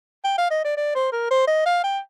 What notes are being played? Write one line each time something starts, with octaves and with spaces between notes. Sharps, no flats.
G5
F5
D#5
D5
D5
C5
A#4
C5
D#5
F5
G5